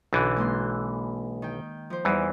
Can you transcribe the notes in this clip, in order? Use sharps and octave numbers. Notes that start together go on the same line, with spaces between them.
B1 D3 E3 C#4
G#3 A#3 C6
D#3 G5
F3 C5
E2 E3 G3 D#4